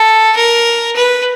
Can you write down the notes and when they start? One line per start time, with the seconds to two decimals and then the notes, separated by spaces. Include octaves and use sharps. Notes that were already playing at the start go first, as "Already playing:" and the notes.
Already playing: A4
0.36 A#4
0.96 B4